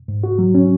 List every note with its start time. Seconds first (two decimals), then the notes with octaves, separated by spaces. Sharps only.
0.08 G#2
0.24 F#4
0.39 F#3
0.55 C#4